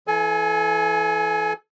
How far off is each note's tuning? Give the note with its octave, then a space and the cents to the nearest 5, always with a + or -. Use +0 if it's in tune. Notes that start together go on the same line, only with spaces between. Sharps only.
E3 +10 A4 -30 G#5 +15